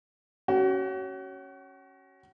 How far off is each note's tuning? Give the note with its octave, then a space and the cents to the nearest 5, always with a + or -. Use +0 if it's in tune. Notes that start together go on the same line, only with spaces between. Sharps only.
C#4 +0 F#4 +35